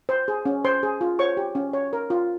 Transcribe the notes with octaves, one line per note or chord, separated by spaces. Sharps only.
C5
G#4
C#4
C5 C6
G#4
F4
C5 C#5 C#6
G4
C#4
C#5
A#4
F4